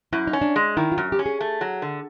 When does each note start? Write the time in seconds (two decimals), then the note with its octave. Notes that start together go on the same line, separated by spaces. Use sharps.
0.13 F#2 E4
0.27 D#4
0.33 C#4
0.42 D4
0.56 G#3
0.77 D#3 E4
0.92 F4
0.98 F#2 F#4
1.12 G4
1.19 C#4
1.26 G#4
1.41 A3
1.61 F#3
1.82 D3